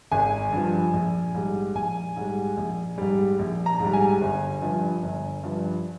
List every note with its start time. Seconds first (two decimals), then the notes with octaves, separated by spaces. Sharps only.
0.12 G#1 G#5
0.53 G2 F3
0.94 A#1
1.34 G#2 G3
1.75 A#1 G#5
2.16 G#2 G3
2.57 A#1
2.98 G#2 G3
3.39 A#1
3.66 A#5
3.80 G#2 G3
3.93 G#5
4.21 G1
4.62 G2 F3
5.02 G1
5.43 G2 F3